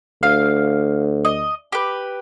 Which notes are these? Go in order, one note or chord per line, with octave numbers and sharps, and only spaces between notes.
D2 F5
D#5
G4 B4